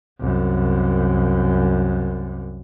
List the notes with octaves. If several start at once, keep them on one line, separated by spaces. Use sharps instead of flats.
C2 F#2